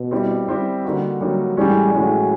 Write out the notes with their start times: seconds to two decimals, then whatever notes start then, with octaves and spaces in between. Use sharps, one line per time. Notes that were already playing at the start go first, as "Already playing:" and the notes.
Already playing: B2
0.11 G3 C4 E4 G4
0.47 G3 C4 E4 G4
0.85 D3 G3 A#3 D#4 F#4
1.21 D3 F#3 G3 A#3 D#4 F#4
1.57 A2 E3 G3 G#3 C#4
1.93 A2 E3 F#3 G#3 C#4